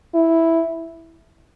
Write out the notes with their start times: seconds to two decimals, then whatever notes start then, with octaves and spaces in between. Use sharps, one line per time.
0.14 E4